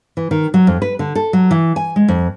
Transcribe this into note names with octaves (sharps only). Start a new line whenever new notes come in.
E3
D#3
F#3
F2
B4
D3
A4
F#3
E3
G#5
G#3
F2